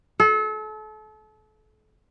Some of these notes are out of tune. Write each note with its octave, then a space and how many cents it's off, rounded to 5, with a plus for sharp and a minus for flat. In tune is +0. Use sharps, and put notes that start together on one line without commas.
A4 -35